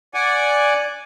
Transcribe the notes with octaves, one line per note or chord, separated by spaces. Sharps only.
D5 F#5 G#5